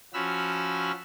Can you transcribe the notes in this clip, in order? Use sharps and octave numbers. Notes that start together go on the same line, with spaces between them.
F3 C#4 F#4 B5 E6 F6